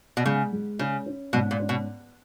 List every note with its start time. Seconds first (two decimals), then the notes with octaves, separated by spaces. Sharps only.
0.17 B2
0.26 C#3 G#3
0.52 G#3
0.79 C#3 C#4
1.06 C#4
1.33 G#2 B2
1.51 A#2
1.60 C#4
1.69 B2